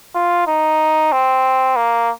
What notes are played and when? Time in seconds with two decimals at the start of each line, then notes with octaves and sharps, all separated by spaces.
0.15 F4
0.47 D#4
1.12 C4
1.76 A#3